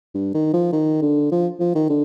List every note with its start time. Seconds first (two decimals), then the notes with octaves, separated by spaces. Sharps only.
0.14 G2
0.34 D#3
0.53 F3
0.72 D#3
1.02 D3
1.32 F3
1.60 F3
1.75 D#3
1.89 D3